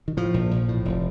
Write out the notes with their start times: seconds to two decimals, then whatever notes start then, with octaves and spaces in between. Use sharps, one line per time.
0.08 D#3
0.17 A2 F3
0.34 A#1
0.51 A#1
0.68 A2
0.85 F1